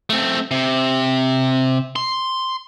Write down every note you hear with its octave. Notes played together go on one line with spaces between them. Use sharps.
A3 C4
C3
C6